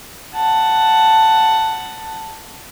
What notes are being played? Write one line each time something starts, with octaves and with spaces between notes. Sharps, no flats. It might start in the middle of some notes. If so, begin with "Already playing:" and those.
F#5 A5